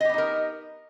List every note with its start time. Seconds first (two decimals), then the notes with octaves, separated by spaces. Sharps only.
0.01 D#5
0.05 G4
0.09 B3
0.14 D#4
0.18 A#4